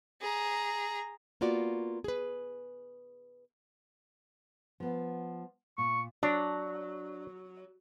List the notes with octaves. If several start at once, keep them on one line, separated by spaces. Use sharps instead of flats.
G#4 A#5
A#3 B3 F4 F#4 D5
G#4 B4
F3 B3
A#2 C#6
F#3 D4